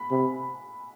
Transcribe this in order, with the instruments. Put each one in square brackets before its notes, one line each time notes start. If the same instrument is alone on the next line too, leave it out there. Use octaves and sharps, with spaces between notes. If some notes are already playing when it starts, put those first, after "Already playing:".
Already playing: [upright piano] B5
[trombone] C3